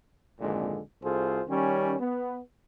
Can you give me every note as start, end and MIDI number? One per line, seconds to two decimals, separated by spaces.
0.40 0.80 32
0.40 0.80 41
0.40 0.80 46
0.40 0.80 50
0.40 0.80 56
1.03 1.42 36
1.03 1.42 65
1.03 1.42 68
1.03 1.42 69
1.03 1.42 72
1.48 1.96 51
1.48 1.96 55
1.48 1.96 61
2.00 2.40 59